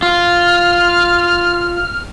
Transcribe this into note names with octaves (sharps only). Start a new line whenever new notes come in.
F4 F6